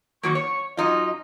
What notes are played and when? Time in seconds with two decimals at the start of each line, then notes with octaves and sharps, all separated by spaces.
0.23 D#3 F#3 A#3 C#6
0.35 C#5
0.77 F#2 D#4 F4 D#5